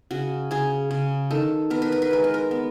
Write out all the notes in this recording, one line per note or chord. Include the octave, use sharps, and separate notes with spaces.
C#3 F#4
C#3 G#4
C#3
D#3 A4
B3 A#4
B4
A#4
B4
G#3 A#4
B4
A#4
B3